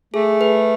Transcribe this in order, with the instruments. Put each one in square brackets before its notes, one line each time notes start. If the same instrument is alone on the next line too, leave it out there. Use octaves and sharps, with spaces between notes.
[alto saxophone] A3 [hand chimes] G#4
[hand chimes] B4